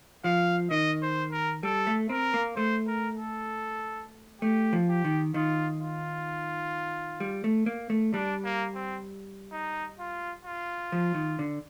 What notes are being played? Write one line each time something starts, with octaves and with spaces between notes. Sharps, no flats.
F3 F5
D#3 D#5
C5
A#4
G3 A4
A3
C4 A#4
A#3
A3 C5
A#4
A4
A3 G4
F3
G4
D#3
D#3 F4
F4
G3
A3
A#3
A3
G3 D4
A#3
C4
D#4
F4
F4
F3
D#3
D3